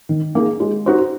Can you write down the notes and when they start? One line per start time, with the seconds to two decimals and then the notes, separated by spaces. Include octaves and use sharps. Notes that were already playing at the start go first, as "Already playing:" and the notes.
0.09 D#3
0.35 A#3 D#4 G#4
0.60 G#3
0.86 D#4 F#4 C5